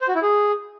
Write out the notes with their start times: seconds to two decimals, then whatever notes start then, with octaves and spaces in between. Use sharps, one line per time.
0.01 C5
0.08 F#4
0.15 E4
0.22 G#4